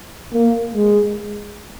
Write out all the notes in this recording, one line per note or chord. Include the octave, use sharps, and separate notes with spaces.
A#3
G#3